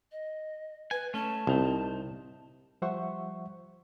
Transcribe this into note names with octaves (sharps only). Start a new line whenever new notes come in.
D#5
B4 G#5
A3 C#4 A5
C2 C3 D#4
F3 G3 C5 E5 F#5 C#6